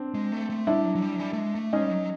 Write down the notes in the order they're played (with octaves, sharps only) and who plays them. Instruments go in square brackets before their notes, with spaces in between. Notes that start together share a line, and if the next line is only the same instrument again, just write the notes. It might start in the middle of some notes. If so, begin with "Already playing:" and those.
Already playing: [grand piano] C4 D4
[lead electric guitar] G#3
A3
A3
[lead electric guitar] G3 [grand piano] D4 E4
[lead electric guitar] F#3
F#3
G3
F#3
G3
A3
G#3
A3
[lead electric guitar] G#3 [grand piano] C#4 D#4
[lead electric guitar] G3
F#3